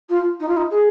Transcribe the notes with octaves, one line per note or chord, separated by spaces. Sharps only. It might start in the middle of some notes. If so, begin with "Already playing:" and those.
F4
D#4
F4
D#4
G#4